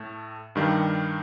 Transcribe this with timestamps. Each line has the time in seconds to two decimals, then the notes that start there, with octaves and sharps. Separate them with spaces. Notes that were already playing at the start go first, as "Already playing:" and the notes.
Already playing: A2 A3
0.55 G2 D#3 G3